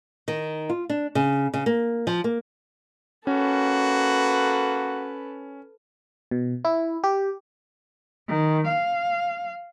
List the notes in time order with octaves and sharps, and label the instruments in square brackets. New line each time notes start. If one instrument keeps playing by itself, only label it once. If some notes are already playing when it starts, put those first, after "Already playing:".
[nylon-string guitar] D#3
F4
D4
C#3
C#3
A#3
F3
A#3
[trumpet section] A#3 F#4 [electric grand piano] C#4 [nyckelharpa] A4 B4
[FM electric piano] B2
E4
G4
[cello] D#3
F5